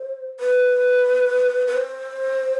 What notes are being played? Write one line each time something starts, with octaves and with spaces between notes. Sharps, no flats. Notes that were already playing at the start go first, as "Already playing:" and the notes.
Already playing: C5
B4
B4
C5